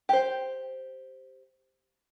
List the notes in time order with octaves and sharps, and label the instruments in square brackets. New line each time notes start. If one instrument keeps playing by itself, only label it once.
[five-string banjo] G4 C5